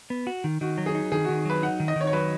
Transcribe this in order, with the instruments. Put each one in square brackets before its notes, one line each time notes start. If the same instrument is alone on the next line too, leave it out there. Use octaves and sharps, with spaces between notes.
[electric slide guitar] B3
F#4
D#3
[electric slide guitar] D#3 [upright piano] F#4
[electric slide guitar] F#3
[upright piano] G#4
[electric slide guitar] D#4
[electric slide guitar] D#3 [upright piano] G#4
[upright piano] F#4
[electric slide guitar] D#3
[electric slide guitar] F#3 [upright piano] B4
[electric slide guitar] D#4 [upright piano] F#5
[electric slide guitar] D#3
[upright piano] D#5
[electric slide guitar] D#3 [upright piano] C#5
[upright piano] C#5
[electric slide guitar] F#3 [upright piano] B4